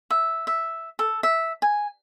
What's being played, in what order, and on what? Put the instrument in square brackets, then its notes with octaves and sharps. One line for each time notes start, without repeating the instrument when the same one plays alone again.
[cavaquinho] E5
E5
A4
E5
G#5